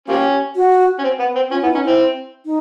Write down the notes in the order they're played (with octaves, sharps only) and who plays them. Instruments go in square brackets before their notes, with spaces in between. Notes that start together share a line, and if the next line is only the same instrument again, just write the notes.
[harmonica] F3 A#3 C#4 [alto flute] G4
[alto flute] F#4
[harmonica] C#4
C4
B3
C4
[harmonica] C#4 [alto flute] F4
[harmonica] B3 [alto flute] E4
[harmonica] C#4 [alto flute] D#4
[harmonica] C4 [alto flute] E4
[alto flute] D#4